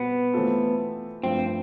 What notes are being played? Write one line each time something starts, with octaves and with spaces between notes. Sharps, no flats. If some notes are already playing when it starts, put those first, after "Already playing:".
Already playing: B2 G3 B3 C4
E3 A3 C4 F4 A4
G2 F3 A3 C4